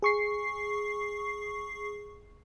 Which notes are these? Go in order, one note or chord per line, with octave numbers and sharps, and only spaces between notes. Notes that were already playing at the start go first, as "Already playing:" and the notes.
G#4 C#6 C7